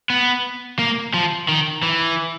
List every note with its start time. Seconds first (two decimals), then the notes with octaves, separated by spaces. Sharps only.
0.10 B3
0.79 A#3
1.14 F3
1.49 D#3
1.83 E3